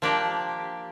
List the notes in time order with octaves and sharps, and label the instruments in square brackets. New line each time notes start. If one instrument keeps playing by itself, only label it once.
[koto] F3 A#3 D4 G4